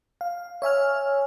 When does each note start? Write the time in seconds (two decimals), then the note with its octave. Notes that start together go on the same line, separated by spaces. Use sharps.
0.21 F5
0.62 C#5 E5 G#5 F6